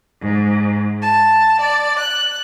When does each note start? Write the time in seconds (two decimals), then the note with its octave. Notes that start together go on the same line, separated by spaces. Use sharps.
0.21 G#2
1.02 A5
1.61 D5
1.99 F#6